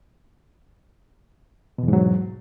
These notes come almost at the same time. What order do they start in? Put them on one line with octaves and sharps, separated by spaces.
B2 E2 G#2 F#3